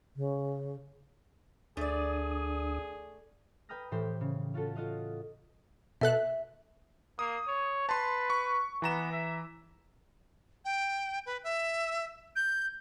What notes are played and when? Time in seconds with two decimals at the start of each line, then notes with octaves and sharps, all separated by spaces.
0.16 C#3
1.77 D2 A3 D4 G#4 D5 D#6
3.69 B4 G5 A#5 D#6 F6 A#6
3.91 A2 E3 G4 C5 G5
4.21 C#3
4.54 C#4 F4 F#4 A4
4.75 F4 F#4 D#5 F5
6.01 B2 A4 E5 F#6
7.19 A#3 D#6
7.47 C#5
7.89 B4 A5 C6
8.30 C#6
8.82 E3 B3 A#5 E7
9.12 E5
10.65 G5
11.26 B4
11.44 E5
12.36 G6